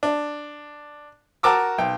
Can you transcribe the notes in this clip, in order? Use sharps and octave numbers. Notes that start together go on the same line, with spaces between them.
D4
F#4 A#4 A5 D6 E6
B1 G5